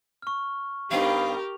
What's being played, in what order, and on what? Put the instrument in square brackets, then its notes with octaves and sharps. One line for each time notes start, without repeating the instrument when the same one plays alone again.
[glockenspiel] C#6 F6
[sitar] G2 B3 D#4 [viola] G4 A#4 [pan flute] F5 [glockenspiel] F7